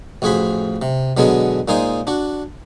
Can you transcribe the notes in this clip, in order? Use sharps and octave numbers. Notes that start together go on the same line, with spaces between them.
A1 F2 F#4 G#4 C5 B5
C3
B2 D3 F#3 G#3 B3 G#4
A#2 G#3 D#4 G#4 C5 D#6
D4 F#4